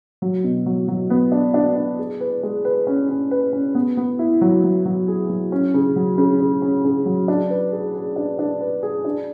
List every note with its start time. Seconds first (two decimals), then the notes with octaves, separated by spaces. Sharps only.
0.22 F#3
0.44 B2
0.66 F#3
0.88 F#3
1.10 B3
1.32 D4
1.54 D4
1.76 D4
1.99 G#4
2.21 B4
2.43 G#3
2.65 B4
2.87 C#4
3.09 C#4
3.31 B4
3.53 C#4
3.75 B3
3.97 B3
4.19 E4
4.41 F#3
4.64 F#3
4.85 F#3
5.08 G#4
5.29 F#3
5.52 C#4
5.74 C#3
5.96 F#3
6.18 C#3
6.40 C#3
6.62 C#4
6.84 C#3
7.06 F#3
7.28 D4
7.50 B4
7.72 G#4
7.95 G#4
8.16 D4
8.39 D4
8.61 B4
8.83 G#4
9.05 D4